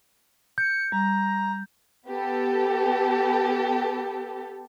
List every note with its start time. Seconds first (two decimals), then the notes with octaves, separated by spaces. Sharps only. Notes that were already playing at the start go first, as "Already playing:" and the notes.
0.58 G6 C#7
0.92 G3 A#5
2.07 B3 G4 A4